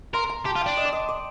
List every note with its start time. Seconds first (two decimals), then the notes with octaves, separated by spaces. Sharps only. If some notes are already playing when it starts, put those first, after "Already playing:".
0.14 A#4 C6
0.29 A#5
0.45 G4 A5
0.56 F4
0.61 G5
0.66 D4
0.77 D#5
0.85 D5
0.93 D#5
1.09 D5